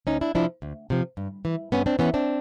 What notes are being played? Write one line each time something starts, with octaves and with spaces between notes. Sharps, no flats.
D2 C#4 D#4
D4 E4
C3 F3 D4 E4
D2
C3 F3
G2
E3
G2 B3 C#4
C4 D4
E3 B3 C#4
C4 D4